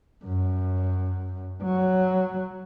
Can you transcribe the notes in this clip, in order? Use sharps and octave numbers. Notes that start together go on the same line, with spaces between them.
F#2
F#3